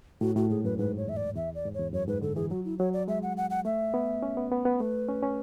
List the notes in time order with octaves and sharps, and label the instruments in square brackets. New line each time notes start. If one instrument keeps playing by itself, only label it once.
[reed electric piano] A2 [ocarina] F#4
[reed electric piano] A2 [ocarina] F#4
[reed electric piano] G#2 [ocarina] G#4
[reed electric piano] F#2 [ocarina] B4
[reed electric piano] G#2 [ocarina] B4
[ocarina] C#5
[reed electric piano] E2 [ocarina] E5
[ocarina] D5
[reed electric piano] E2 [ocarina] E5
[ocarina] D5
[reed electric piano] G#2
[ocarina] C#5
[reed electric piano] E2
[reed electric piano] F#2 [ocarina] C#5
[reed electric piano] G#2 [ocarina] B4
[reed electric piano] D3 [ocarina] A4
[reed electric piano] E3 [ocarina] G#4
[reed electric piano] F#3 [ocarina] F#4
[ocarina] E4
[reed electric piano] F#3 [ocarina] C#5
[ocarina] D5
[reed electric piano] G#3 [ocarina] E5
[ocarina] F#5
F#5
F#5
[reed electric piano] A3 [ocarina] E5
[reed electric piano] B3
C#4
B3
B3
B3
[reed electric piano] A3 [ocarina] B4
[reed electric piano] C#4
C#4